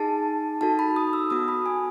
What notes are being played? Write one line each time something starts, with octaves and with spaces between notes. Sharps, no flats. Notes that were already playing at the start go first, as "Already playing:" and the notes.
Already playing: D#4 G#4 A5
D#4 F#4 A4 A5
B5
D#6
E6
B3 F#4 A4 D#6
B5
G#5